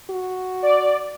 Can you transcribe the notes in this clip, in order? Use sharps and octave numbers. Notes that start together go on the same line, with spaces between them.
F#4
D5